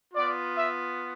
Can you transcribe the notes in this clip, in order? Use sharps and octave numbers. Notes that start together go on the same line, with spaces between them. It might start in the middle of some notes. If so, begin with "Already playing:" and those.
B3 F4 D5
E5